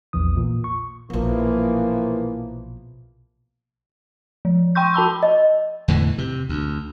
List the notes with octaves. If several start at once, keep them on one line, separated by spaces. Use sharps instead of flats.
A#1 E2 E3 D#6
A#2
C#6
A#1 B2 E3 F3 A#3
F3
G5 C6 C#6 G6
F#4 A5 B5 E6
D#5
E2 A2 D3 E3
C3
D2